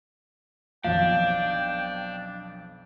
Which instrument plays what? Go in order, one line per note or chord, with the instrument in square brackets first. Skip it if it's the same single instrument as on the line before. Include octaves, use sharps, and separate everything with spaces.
[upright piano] B1 F2 [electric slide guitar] D4 [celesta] F5 [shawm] G5